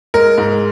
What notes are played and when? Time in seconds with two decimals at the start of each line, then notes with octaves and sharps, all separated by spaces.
0.14 G#3 A#4
0.38 G#2